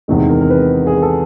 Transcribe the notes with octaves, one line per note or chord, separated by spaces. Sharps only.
E2 C3 D#3 G#3
A#4
A#4
B4
G#4
A4